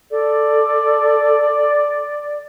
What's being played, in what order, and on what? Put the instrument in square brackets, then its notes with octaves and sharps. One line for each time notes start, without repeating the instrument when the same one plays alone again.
[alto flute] A4 [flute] D5